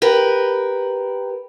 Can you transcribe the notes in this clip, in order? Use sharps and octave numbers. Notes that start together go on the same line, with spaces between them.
G4 A#4 B4